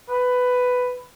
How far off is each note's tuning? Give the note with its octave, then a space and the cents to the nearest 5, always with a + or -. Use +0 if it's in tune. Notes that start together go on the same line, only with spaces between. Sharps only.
B4 +10